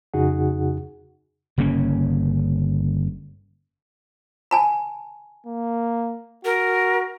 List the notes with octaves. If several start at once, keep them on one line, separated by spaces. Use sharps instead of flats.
F2 C#3 D#4 F#4 G#4 F#5
G1 C#3 A#3 C#4
G#5 A5 B5
A#3
F#4 A#4